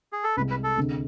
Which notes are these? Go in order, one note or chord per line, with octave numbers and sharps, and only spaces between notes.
G#4
A4
C2 C3 G#3 B4
B4
A4
D2 C3 G#3